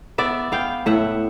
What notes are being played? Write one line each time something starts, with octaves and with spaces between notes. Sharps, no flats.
B3 D5 E5
B3 F5 G5
A2 E5 F#5